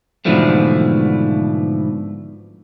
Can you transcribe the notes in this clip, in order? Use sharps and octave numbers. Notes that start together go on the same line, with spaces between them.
G#2 B2 D3 E3 F3 A3